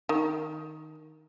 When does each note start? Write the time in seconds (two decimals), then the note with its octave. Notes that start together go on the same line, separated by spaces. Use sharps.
0.09 D#3